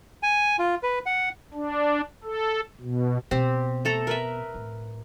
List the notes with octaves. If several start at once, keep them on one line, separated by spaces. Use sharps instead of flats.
G#5
F4
B4
F#5
D4
A4
B2
B2 C4 G4
A3 A4 A#5
A#4 B4 E5
A2